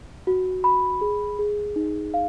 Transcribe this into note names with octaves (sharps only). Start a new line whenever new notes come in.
F#4
B5
G#4
G#4
D#4
F5